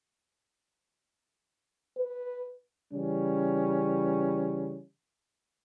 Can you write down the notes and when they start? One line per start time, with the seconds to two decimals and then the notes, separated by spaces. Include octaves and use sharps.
1.97 B4
2.94 C#3 E3 G3 C#4